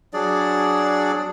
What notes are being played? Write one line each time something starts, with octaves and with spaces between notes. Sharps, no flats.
F#3 D4 G#4 D5